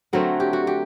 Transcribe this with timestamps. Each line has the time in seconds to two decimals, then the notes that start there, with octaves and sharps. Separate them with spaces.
0.13 D3 F#3 A3 C4 A#4
0.40 G4
0.53 F#4
0.67 G4